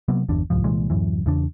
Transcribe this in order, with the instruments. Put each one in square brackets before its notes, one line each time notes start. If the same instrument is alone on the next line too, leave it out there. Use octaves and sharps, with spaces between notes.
[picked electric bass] C3 F#3 A#3 B3
G1 E2 D4
D#1 C2 G#2 F3
C2 A#2 E3 G#3
D1 F#2 E3
E2 C#3 D4